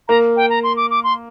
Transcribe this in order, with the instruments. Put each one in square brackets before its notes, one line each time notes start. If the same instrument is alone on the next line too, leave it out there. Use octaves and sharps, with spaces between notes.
[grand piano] A#3 [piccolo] A#5
[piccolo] G5
A#5
C6
D6
D6
C6